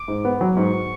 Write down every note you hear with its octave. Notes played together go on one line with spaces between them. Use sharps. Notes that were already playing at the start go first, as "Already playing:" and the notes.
Already playing: D6
G#2
B3
F#3
G#2 C#6